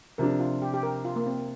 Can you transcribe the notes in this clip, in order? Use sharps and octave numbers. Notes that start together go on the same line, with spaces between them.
C3 F3 D4 A#4
F4
G4
G4
A#4
F4
A#3
C4